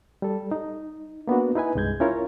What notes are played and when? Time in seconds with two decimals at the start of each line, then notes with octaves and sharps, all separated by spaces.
0.22 G3 A4
0.51 D#4
1.27 A#3 B3 D4 F#4
1.56 D#4 E4 B4 G#5
1.75 C2 G2 G#3 G6 G#6
2.00 C#4 E4 F4 A#4 C#5